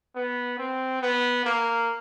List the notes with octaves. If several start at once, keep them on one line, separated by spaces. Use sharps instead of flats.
B3
C4
B3
A#3